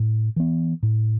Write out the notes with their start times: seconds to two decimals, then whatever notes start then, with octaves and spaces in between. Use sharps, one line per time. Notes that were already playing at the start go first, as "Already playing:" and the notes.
Already playing: A2
0.36 E3 B3
0.83 A2